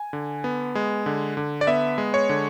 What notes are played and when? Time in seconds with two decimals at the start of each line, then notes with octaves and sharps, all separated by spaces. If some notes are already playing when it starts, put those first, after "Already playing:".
Already playing: G#5
0.13 D3
0.44 B3
0.75 G#3
1.06 D3
1.37 D3
1.61 D5
1.67 B3 E5
1.98 G#3
2.14 C#5
2.29 D3